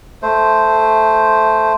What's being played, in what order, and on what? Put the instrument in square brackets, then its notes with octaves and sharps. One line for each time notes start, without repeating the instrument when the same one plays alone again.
[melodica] A3 C5